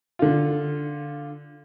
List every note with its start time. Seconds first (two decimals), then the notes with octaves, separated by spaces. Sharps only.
0.19 D3 F4